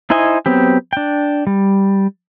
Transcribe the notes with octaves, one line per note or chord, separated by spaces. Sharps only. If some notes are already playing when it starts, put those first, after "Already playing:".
D#4 E4 C5 D#5 G#5
F#3 B3 C4 G4
D4 G5
G3